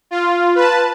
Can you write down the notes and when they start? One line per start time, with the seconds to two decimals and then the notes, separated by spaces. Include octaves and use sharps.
0.11 F4
0.55 B4 A5